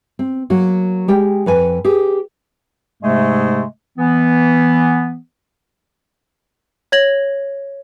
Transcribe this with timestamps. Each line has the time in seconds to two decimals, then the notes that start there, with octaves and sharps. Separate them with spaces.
0.19 C4
0.50 F#3 A#3 F#4
1.08 G#3 G4 G5
1.46 F2 B4 G#5
1.84 G4 G#4
3.03 G#2 C3 G#3 A3
3.98 E3 B3
6.92 C#5 G#6 A#6 F#7